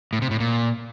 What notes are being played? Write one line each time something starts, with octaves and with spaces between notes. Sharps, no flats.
A2
C3
A2
A#2